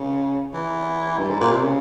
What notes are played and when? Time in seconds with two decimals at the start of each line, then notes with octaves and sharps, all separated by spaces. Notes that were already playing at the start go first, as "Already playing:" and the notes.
Already playing: C#3
0.54 E3
1.18 G2
1.30 G#2
1.41 A#2
1.51 C3
1.62 C#3